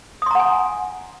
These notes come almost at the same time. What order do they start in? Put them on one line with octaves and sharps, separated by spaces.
D#6 C6 A#5 F#5 G#5